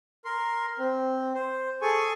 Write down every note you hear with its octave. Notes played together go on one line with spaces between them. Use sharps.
A#4 C6
C4
C5
G#4 A4 G#5 C#6